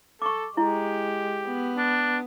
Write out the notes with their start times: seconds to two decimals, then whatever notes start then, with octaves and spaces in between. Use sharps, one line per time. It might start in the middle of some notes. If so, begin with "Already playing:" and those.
0.22 A4 C#6 D6
0.57 G#3 E4 G4
1.46 B3
1.77 D4